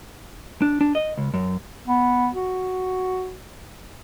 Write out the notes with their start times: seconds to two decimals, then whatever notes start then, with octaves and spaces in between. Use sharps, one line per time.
0.62 D4
0.81 D4
0.95 D#5
1.18 C#2
1.34 F#2
1.88 B3
2.34 F#4